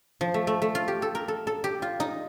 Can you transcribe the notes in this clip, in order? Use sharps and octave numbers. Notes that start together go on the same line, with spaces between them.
F3
A3
A3
A3
F4
G4
A4
A#4
A4
A4
G4
F4
D#4